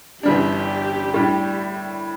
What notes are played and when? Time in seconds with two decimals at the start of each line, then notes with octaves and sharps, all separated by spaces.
0.23 G1 F#2 E3 G3 D4 G4
1.14 A2 G3 D4